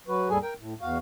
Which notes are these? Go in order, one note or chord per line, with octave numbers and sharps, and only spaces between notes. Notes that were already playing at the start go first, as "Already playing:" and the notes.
F#3 F#4 B4
D#2 G#2 G3 G#4 A4 G#5
A#4 G5
A2
E2 F#4 F5